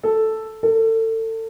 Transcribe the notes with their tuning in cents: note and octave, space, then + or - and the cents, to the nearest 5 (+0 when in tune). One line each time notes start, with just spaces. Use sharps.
A4 +0
A4 +30